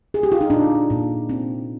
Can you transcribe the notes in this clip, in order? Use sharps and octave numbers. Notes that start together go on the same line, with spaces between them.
G#4
G4
F4
D#4
A#2 D4
A#2
C4